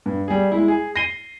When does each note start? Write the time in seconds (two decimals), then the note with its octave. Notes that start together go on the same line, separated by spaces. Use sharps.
0.06 G2
0.28 G3 G#4
0.52 G#3 E4
0.68 G#4
0.96 A#6 C7 D#7 G7